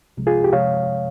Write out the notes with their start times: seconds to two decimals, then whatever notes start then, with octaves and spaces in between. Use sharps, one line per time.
0.17 C2 C3 F3 G#3
0.27 F4 G#4
0.44 G4
0.53 C3 F3 G#3 C#5 F5